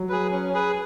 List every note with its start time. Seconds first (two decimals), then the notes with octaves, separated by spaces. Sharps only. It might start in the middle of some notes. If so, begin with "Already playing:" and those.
Already playing: F#3
0.09 G#4 B4
0.32 C#4
0.54 G#4 B4